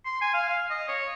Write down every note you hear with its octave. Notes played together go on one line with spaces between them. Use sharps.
C6
G#5
F5
F5
D#5
C#5